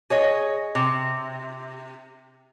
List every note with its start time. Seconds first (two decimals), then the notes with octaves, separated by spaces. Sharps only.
0.10 G#4 C#5 D#5
0.75 C3